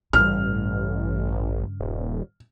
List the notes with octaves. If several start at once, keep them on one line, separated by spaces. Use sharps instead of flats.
A1 G2 C#3 F6
D#1